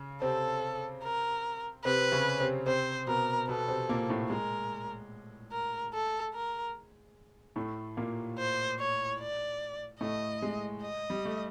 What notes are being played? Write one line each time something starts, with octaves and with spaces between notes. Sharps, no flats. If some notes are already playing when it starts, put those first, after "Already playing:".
Already playing: C#3
C3 C4 A4
A#4
C3 C4 B4
C#3 C#4
C3 C4
C3 C4 C5
B2 B3 A#4
B2 B3 A4
C3 C4
A#2 A#3
A2 A3
G#3 A#4
A#4
A4
A#4
A2 A3
A#2 A#3
C5
C#5
D5
A2 A3 D#5
G#3
D#5
G3
A3